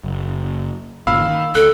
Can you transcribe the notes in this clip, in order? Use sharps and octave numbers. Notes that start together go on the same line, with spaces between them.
F#1
G1 A#2 C#3 F5 B5 E6
D#3
D2 A4 F#6